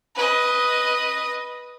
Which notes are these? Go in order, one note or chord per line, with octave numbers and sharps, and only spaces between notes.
B4 D#5